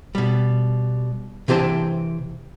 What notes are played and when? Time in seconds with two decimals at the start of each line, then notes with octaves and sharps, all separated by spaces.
0.15 B2 G3
1.48 C3 E3 G4 C5 A5